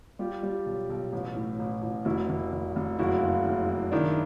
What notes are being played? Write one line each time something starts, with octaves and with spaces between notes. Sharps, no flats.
G3 F4 G4
G3
B1
B1
A1
A2
A1
A1
F1 E4 F#4
F1
F1
F1
F#1 E4 F#4
F#1
F#1
F#1
D#3 D4 E4